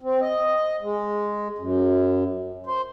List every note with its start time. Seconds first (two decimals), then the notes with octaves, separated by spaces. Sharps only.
0.01 C4
0.21 D#5
0.82 G#3
1.58 F#2
2.66 C5